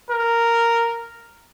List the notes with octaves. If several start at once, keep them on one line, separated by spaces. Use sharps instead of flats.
A#4